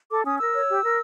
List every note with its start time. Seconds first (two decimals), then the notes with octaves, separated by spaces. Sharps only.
0.11 A4 D6
0.25 C#4 D#6
0.39 A#4 E6
0.54 C#5
0.68 G4
0.82 A#4